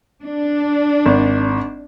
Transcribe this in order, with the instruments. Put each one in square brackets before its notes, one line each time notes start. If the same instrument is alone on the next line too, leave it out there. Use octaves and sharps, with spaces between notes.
[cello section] D4
[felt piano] G#1